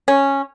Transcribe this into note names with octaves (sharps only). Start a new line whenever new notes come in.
C#4